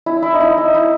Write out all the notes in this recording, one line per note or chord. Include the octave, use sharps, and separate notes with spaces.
E4
E4
D#4
E4
D#4
E4